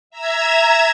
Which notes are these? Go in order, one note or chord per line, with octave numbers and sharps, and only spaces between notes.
E5 A#5 E6 G#6